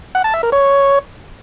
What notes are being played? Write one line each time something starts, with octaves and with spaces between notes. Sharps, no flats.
F#5
A5
E5
A#4
C#5